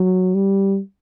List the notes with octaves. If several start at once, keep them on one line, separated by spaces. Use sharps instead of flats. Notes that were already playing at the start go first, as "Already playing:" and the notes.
Already playing: F#3
G3